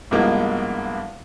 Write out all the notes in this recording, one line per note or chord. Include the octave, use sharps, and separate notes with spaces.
C2 G2 F3 G#3 A#3 B3